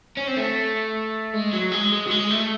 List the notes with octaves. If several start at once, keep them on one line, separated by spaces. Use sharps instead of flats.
C#4
C4
A3
G#3
F#3
G#3
G#3
F#3
G#3
A3